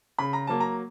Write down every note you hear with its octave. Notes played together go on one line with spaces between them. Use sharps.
C#3 B5
A#5
F#3 A#3 A5
A#5